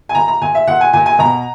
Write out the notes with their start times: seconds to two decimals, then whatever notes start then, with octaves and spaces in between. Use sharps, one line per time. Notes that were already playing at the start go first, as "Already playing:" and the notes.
0.09 G#5
0.15 A#2 A#5
0.28 A#5
0.41 A#2 G#5
0.55 E5
0.67 A#2 F#5
0.81 G#5
0.93 A#2 G#5
1.06 G#5
1.19 B2 A#5